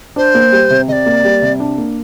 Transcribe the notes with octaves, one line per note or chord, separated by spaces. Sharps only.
D4 C5
A#3
G3
C3
C3 D5 D#5
A#3
G3
C3
D4
A#3